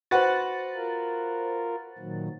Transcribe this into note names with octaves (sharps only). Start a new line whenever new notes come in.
F#4 B4 C5 F#5 A6
F4 A#4
A#2 D#3 F#3